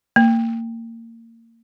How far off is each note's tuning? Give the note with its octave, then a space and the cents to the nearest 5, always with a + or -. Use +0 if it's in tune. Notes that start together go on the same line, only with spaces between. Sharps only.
A#3 -30